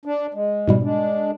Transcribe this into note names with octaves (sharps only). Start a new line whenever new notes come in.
D4
G#3
G#2 B2 G3
G#3 D4